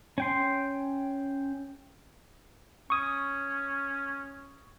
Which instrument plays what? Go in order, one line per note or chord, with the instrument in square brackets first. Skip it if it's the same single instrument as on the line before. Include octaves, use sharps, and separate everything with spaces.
[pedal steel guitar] C#4 G5 C6
[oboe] C#4 [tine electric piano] C#6 D#6